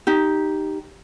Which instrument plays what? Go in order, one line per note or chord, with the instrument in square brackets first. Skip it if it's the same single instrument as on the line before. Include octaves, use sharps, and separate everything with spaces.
[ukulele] D#4 G4